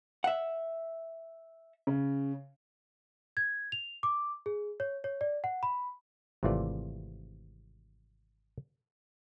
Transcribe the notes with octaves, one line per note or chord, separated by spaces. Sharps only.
E5 F#5
C#3
G#6
F7
D6
G#4
C#5
C#5
D5
F#5
B5
G#1 C3 E3 A3 F4 D5